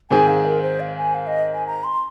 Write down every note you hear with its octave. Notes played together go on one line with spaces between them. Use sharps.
G#2 D#3 C4 G#4 G#5
F5
A#4
C5
F5
G#5
F5
D#5
G#5
A#5
C6